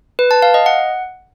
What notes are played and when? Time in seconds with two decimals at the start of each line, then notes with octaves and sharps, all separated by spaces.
0.19 B4
0.31 A5
0.42 F5
0.54 D#5
0.66 F#5